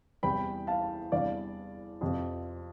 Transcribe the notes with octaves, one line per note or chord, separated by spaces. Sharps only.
E2 C3 E3 G3 G5 B5
F5 A5
E2 C3 G3 D4 D5 F5
F2 C3 F3 C4